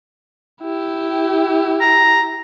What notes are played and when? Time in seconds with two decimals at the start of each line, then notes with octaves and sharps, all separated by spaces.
0.62 E4 G4
1.81 A#5